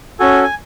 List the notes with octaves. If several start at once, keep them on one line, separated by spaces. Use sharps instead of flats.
C#4 F#4 A4 G#5
G#5